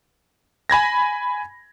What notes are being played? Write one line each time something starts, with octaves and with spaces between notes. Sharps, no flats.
G#5 B5 G#6 A#6